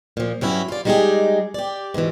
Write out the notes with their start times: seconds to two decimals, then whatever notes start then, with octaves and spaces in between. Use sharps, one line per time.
0.17 A#2 F3
0.41 G2 F#3 C#4 E4
0.68 F4 D5
0.85 G3 G#3 D#4 F4 G4 G#4
1.54 G4 D5
1.94 G#2 B2 D3 E3